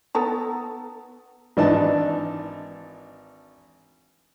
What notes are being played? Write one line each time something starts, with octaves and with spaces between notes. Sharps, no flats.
B3 A4 A#5
G#1 E3 D4 D#4 A5